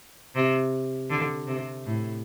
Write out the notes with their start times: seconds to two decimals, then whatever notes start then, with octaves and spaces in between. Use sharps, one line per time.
0.35 C3
1.10 D3
1.47 C3
1.85 A2